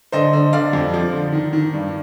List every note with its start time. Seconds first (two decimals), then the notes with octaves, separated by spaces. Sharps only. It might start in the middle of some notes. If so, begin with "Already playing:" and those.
0.12 D3 C5 D#5
0.33 D3
0.53 D3 D5 F5
0.73 F2
0.93 F3
1.13 D3
1.33 D#3
1.53 D#3
1.73 G2